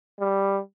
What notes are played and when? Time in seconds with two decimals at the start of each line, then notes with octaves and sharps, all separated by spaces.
0.20 G3